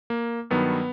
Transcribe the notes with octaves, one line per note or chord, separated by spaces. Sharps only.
A#3
G2 D#3 F#3 B3